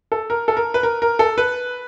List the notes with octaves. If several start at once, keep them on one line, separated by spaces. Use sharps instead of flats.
A4
A#4
A4
A#4
B4
A#4
A#4
A4
B4